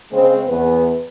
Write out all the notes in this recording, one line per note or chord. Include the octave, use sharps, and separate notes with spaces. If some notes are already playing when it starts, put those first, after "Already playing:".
C#3 G#3 C4
E2 B3 B4